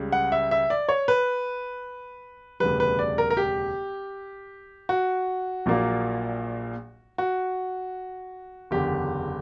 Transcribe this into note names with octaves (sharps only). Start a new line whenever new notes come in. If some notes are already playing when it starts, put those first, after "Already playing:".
Already playing: C#2 C#3 G3
F#5
E5
E5
D5
C#5
B4
E1 D2 C#3 G3 B4
B4
D5
A#4
A#4
G4
F#4
A#1 A#2 F#3 A#3
F#4
F#1 E2 D3 G4